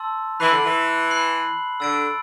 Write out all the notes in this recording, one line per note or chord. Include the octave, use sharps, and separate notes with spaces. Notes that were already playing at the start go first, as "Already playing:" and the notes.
Already playing: A5 C6 E6 A6
E3 B5 F#6 C7 F#7
D3
E3
B5 F#6 C7 F#7
D3 E6 A6 D7